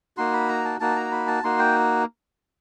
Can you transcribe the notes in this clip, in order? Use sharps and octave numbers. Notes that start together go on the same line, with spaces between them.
A#3 D#4 F#4 C6
B5
A#5
A5
A#3 D#4 F#4 A5
A#5
B5
A5
A#3 D#4 F#4 C6
G5